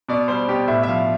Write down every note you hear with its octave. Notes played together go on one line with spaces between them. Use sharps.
B2 D5
G3 C5
B2 G4
A2 E5
E5
F3 F5